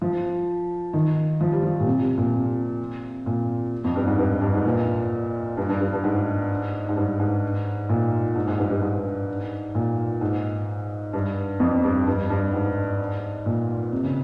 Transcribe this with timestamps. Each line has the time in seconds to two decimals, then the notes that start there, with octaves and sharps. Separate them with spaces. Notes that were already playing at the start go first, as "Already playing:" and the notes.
0.01 F3
0.93 D#3
1.41 F3
1.52 G3
1.63 F3
1.80 A#2
1.87 C3
2.02 C3
2.18 A#2
2.34 C3
3.26 A#2
3.84 F2
3.96 G2
4.07 G#2
4.18 G2
4.41 G2
4.54 G#2
4.65 A#2
5.57 G2
5.69 G2
5.80 G2
5.93 G2
6.04 G#2
6.89 G#2
6.96 G2
7.20 G#2
7.89 A#2
8.36 G#2
8.48 G#2
8.58 G2
8.71 G2
8.82 G#2
9.75 A#2
10.21 G#2
11.13 G2
11.60 F2
11.83 G2
12.07 G2
12.30 G2
12.53 G#2
13.46 A#2
13.92 C3
14.03 C#3